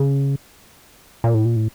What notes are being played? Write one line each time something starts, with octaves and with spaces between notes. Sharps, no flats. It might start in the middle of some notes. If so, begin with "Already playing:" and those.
Already playing: C#3
A#2
A2
A#2
A2